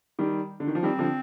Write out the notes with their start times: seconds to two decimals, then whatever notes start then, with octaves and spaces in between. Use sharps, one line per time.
0.19 D#3 G3
0.60 D3
0.67 D#3
0.75 F3
0.83 D#3 G3 C4
0.99 D3 F3